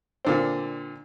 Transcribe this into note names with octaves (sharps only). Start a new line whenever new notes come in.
A#2 D3 C4